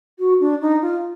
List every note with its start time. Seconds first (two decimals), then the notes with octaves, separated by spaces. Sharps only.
0.19 F#4
0.40 D4
0.61 D#4
0.82 F4